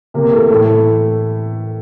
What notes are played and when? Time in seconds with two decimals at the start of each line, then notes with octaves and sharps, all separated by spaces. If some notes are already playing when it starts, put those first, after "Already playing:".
0.14 C3 A#3
0.32 E3 A3
0.50 A2 A3
0.61 A3
0.67 E3